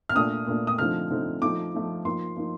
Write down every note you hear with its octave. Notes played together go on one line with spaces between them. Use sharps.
F6
A#2 A3 D4 D#6
A#2 A3 D4
D#6
D3 F3 A3 C4 D#4 F6
D3 F3 A3 C4 D#4
F3 A3 D#4 D6
F3 A3 D#4
F3 A#3 D#4 C6
F3 A#3 D#4